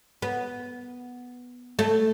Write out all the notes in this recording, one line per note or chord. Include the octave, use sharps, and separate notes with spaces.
B3
A3